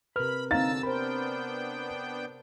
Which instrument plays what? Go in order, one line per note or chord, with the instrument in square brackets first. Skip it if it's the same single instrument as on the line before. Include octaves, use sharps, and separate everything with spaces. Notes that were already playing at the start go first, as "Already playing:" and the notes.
[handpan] C3 A#4 [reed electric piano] B4 F6 [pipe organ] B5
[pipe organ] D3 A5 E6 [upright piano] C4 A6 [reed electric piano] D#4 F5 A#5
[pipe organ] B3 D4 G5 [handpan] A#4 C5 [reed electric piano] B5